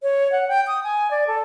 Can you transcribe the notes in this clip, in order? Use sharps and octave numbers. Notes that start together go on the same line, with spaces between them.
C#5
F#5
G5
D#6
G#5
D5
A4